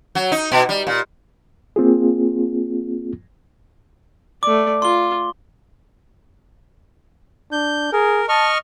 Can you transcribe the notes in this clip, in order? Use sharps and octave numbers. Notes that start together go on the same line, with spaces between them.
F#3
D#4
B2
G3
A#2
A#3 C4 F4 G#4
A3 D5 D6
F4 C6 G7
D4 G6
G#4 A#4
D#5 A5 C#6 F6